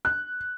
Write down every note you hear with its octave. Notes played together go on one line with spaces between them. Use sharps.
F#6